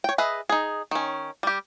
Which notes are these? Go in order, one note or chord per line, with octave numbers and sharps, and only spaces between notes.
C#5 G5
G#4 B4 D#5 E5
D#4 G#4
D#3 C#4
G3 G4